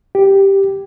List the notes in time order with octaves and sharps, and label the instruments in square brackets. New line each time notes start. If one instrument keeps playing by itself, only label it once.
[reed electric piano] G4